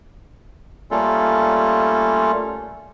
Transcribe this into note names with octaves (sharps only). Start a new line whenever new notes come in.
G3 A3 A#3 C#4 F4 A4